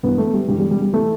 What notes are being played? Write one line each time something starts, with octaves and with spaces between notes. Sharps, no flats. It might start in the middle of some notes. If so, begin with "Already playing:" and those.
G2 E3 B3
A3
G3
G2 E3 G3
G3
G3
G3
E3 A3